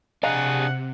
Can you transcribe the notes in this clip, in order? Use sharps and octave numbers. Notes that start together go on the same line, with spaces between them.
C3 D4 G#4 D#5 F5 F#5 A#5